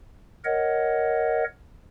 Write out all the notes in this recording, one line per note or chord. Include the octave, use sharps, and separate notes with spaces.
A#4 C#5 D#5 F#5